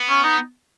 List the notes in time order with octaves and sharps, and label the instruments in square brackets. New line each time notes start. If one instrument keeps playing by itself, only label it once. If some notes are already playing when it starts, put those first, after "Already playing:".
Already playing: [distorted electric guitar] B3
[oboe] C#4
D#4